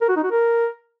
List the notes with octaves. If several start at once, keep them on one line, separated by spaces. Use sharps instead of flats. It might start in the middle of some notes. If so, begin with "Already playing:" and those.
A#4
F#4
D#4
F#4
A#4